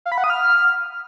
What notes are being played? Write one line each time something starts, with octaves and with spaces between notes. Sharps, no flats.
F5
B5
F#5
D#6
F6